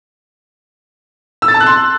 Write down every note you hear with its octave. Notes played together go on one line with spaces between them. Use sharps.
E6
A6
A5
F#6
C6